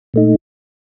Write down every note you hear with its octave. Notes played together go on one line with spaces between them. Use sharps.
A#2 A3 D#4